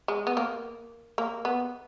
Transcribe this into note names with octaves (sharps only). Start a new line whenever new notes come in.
G#3
B3
A#3
A#3
B3